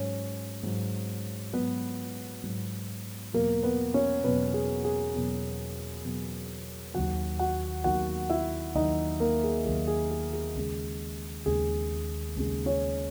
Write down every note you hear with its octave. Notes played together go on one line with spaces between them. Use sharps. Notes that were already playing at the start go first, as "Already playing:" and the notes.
Already playing: G#2 F#3 C#4 C#5
G#2 F#3
G#2 F#3 B3 B4
G#2 F#3
E2 B2 F#3 A#3 A#4
B3 B4
C#4 C#5
E2 B2 F#3 B3 B4
G#4
G#4
E2 B2 F#3
E2 B2 F#3
D#2 D#3 F#3 F#4 F#5
F#4 F#5
D#2 D#3 F#3 F#4 F#5
E4 E5
D#2 D#3 F#3 D#4 D#5
A#3 A#4
G#4
D#2 D#3 F#3 G#4
G#4
G#4
G#4
D#2 C#3 G#3
D#2 C#3 G#3 G#4
D#2 C#3 G#3
C#4 C#5